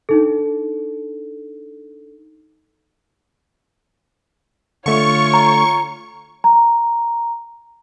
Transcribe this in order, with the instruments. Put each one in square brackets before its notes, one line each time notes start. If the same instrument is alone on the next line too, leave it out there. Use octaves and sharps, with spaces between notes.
[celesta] D4 D#4 A4
[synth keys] D3 A3 [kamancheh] F4 C#5 [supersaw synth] C#6
[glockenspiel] A#5
[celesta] A#5